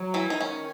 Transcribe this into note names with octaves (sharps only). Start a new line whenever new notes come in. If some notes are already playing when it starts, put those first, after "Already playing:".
Already playing: F#3
E3 E4
D#3 D#4
C#4